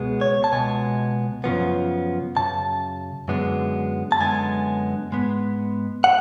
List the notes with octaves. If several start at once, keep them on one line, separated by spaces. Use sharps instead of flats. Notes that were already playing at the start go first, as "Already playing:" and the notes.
Already playing: C#2 B2 G#3 B3
C#5
A5
C#2 B2 G#3 B3 G#5
F#2 C#3 F3 B3
F#2 C#3 A5
F#2 D3 G#3 B3
A5
F#2 D3 G#3 B3 G#5
G#2 G#3 B3
F#5